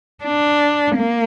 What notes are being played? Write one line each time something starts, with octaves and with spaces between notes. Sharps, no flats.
D4
A#3